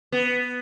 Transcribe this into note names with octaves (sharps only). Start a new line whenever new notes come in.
B3